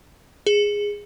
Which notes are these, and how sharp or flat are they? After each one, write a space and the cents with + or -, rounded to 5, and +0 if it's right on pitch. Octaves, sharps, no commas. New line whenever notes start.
G#4 -10